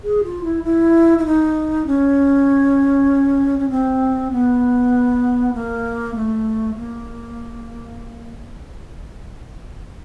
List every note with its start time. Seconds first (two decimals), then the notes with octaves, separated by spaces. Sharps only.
0.03 G#4
0.24 F4
0.44 E4
0.64 E4
1.18 E4
1.25 D#4
1.87 C#4
3.59 C#4
3.70 C4
4.32 B3
5.54 A#3
6.15 A3
6.76 A#3